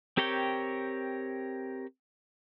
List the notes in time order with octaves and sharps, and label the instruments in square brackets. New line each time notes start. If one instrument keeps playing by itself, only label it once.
[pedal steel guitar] C4 G4 A#4 C#5 G5